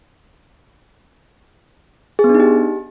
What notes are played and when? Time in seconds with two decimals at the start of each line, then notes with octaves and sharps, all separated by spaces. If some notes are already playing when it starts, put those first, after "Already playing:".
2.19 G#4
2.24 B3
2.29 D4
2.34 D#4
2.40 G4